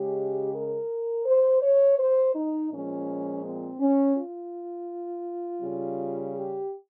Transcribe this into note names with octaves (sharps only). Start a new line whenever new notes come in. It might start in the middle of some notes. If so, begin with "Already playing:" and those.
Already playing: C#3 G#3 G4
A#4
C5
C#5
C5
D#4
A#2 F3 G#3 C#4
C4
C#4
F4
C#3 G3
G4